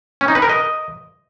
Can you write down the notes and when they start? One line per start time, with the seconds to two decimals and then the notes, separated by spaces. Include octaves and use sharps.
0.21 C#4
0.28 D#4
0.35 B4
0.42 A#4
0.49 D#5